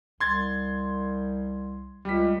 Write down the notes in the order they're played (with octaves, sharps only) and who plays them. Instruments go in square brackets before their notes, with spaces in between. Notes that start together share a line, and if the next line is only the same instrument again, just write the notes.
[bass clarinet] C2 [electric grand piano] C6 G#6 A6
[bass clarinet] C#2 [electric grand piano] G3 B6